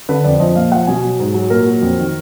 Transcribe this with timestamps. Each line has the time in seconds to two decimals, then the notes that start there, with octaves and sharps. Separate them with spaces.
0.09 D3 B4
0.24 F2 D5
0.40 F3 D#5
0.55 A#2 F5
0.72 F3 F#5
0.87 B2 G#5
1.03 F#3
1.20 G#2
1.34 F#3
1.50 A#2 A#4
1.66 F#3
1.82 F2
1.97 D#3